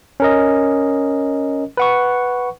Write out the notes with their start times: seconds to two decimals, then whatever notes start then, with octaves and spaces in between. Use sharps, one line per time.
0.20 C#4 A#4 D#5
1.77 B4 F#5 C#6